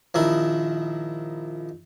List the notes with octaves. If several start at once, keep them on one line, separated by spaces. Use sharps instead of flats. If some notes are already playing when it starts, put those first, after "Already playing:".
A#1 D#3 E4